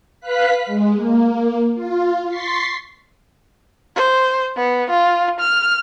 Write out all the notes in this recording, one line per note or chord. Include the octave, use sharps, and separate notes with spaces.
B4 F5 F#6 B6
G#3
A#3
F4
C6 C#6 A6 B6 C7
C5
B3
F4
F6